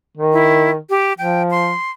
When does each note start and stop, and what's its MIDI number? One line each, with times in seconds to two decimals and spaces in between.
0.17 0.78 51
0.33 0.70 64
0.90 1.13 67
1.19 1.74 53
1.19 1.43 79
1.51 1.91 84